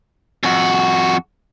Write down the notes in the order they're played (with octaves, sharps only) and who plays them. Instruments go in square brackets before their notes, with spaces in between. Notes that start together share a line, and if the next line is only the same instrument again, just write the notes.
[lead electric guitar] F2 F#4